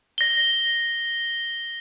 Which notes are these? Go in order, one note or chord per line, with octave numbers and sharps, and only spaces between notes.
A#6 G7